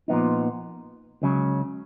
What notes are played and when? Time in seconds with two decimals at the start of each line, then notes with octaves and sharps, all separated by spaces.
0.08 A#2 F3 B3 D#4
1.22 C#2 C#3 F#3 C#4